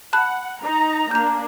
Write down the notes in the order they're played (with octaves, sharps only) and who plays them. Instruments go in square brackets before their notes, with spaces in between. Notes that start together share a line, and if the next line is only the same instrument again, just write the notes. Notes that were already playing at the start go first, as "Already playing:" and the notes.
[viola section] F#5 [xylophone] A5 B5 F#6
[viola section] D#4 A#5
[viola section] A#3 D4 [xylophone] A#5 G6